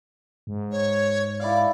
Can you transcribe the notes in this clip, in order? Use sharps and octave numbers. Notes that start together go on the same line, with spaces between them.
G#2
C#5
E4 G4 D5 F5